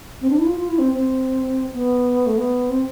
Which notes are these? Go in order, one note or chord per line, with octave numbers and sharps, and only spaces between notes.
C4
D4
E4
F4
F4
E4
C4
C4
B3
A3
B3
C4